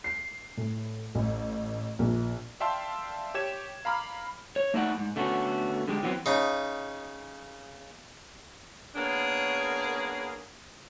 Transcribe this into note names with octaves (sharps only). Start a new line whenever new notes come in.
C7
A2
A1
A#1
D5 E5 F5 G5 A5 C6
G4 C#5 G#6 E7
F5 A#5 B5 D6 F6
C#5
A3 D#4 E4 D5 F#5
G#2
D3 A3 B3 C#4 F#4
D3 G#3 G4
E3 F#3 B3 C4
C#3 D#4
A#3 B3 C#4 D4 G#4